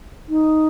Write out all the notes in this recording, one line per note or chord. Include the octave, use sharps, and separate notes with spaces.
D#4